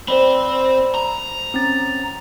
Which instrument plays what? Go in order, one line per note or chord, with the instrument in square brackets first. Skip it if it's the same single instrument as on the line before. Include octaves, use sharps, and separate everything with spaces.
[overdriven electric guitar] C4 [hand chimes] C5 D5 B5
[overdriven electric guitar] A#5
[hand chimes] C4 C#4 A6